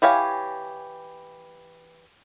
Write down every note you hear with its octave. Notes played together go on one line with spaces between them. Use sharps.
E3 G4 C#5 F5 G#5